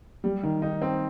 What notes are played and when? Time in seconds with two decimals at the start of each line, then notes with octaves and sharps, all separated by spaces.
0.24 G3
0.43 D#3
0.62 D#4
0.82 C4